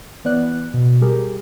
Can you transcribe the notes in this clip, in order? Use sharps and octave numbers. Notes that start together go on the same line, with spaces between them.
E3 B3 D5 F#6
B2
G3 G4 G#4 A#4